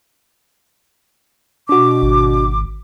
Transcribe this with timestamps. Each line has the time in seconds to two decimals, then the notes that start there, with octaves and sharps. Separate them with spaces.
1.69 B2 D4 F#4 D6
2.02 G#1